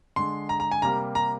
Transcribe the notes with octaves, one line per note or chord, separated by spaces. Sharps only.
D3 G#3 C6
A#5
A#5
G#5
C3 G3 A#3 A#5
A#5